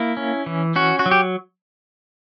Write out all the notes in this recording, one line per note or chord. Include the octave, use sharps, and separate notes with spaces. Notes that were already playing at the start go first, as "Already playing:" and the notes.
Already playing: A#3 E4
C#4
E3
C#4 F#4
F#4
F#3
G4